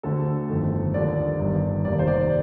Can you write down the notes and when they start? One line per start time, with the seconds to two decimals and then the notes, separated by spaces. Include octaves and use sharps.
0.03 D2 D3 A3 C4 A4
0.49 G1 F2 D#3 A3
0.94 D#2 D3 F3 D5
1.39 G1 G2 D#3
1.84 F1 D#2 D#3 A#3 D5
1.99 C5
2.08 D5